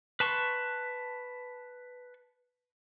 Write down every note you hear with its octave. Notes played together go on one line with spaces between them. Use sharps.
B4 A5 C6 C#6